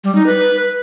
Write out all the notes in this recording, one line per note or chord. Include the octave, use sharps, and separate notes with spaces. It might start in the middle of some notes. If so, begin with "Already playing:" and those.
G3
D#4
B4